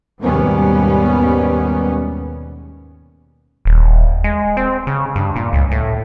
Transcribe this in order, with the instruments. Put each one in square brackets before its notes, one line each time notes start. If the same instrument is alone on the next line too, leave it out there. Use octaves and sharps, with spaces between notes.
[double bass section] D#2 G#2 B2 G3 B3 C#4
[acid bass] D#1
G#3
C4
C#3
G2
A#2
C#2
A2